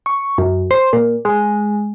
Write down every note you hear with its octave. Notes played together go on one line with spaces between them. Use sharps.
C#6
F#2
C5
A#2
G#3